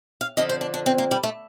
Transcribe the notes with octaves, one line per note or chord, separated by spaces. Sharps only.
F5
F2 D3 F3 D#5
C5
D4
D4
C4
A#3
G3
A3